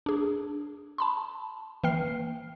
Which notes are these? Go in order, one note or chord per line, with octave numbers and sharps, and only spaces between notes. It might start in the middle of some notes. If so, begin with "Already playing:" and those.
D4 G#4
A5 B5 C6
E3 A#3 G5 F6 C7